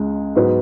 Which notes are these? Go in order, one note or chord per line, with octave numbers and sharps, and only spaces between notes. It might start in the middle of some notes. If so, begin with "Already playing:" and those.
Already playing: C#2 C#3 G#3
G#2 F#3 B3 F#4 B4